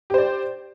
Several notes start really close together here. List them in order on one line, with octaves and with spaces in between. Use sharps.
G4 C5 D5